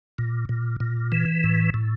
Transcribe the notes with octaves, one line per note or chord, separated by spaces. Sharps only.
A#2
A#2
A#2
E3
A2
A2